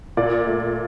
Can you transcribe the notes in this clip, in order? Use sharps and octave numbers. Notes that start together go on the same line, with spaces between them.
A#2 D5
A3